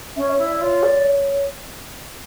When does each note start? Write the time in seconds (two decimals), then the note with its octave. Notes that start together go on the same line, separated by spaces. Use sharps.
0.16 C#4 E5
0.31 C#5
0.38 E4
0.45 D5
0.61 F4 C#5
0.83 D5